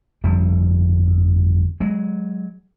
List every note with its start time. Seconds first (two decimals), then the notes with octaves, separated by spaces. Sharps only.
0.24 G1 F2 F3 G3
1.80 F#3 G#3